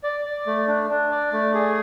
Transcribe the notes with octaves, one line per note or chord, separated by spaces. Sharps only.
D5
D5
A3
D4
D4
D5
A3
G#4